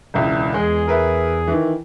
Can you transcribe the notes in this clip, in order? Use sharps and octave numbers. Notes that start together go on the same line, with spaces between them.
E1 C#2 E4
E2 G#3 G#4
A#4 B4 E5
D#3 E3